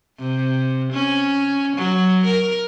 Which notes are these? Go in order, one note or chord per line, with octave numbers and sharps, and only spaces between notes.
C3
C#4
F#3
A#4